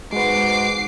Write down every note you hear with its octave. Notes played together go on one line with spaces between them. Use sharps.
G#2 G#3 F#4 B4 D6 C7